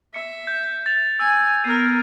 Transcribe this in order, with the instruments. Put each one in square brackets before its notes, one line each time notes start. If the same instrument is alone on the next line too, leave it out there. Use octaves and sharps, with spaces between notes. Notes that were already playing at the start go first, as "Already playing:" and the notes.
[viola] E5 [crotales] C#7
[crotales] G6
A6 F7
[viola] G#5 [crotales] E6
[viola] B3 A#4 [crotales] G#6 C7 D#7